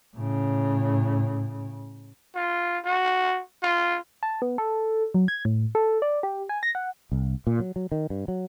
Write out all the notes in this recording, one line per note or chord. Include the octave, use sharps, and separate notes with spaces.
A2 C#3
F4
F#4
F4
A5
B3
A4
F#3
G#6
A2
A4
D5
G4
G#5
A#6
F#5
C2
A#2
F#3
F#3
D#3
G2
F#3